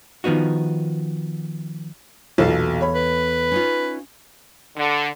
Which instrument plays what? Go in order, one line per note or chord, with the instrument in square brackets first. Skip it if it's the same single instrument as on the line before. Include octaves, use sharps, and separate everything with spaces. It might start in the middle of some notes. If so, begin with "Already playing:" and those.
[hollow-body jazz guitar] D#3 F3 B3 D#4 F#4
[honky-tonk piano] B1 A#2 F#3 [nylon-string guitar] E2 A4 F5
[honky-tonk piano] C#5 B5
[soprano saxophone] B4
[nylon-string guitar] C#4 D#4 F4
[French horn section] D3